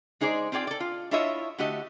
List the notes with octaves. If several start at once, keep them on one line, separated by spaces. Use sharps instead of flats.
G#3 D#4 G#4 C5 D5
C4 F4 G#4 D5 G5
A4 D5
F4
D4 E4 F4 C#5 D#5 E5
D3 A3 F#4 G4 D#5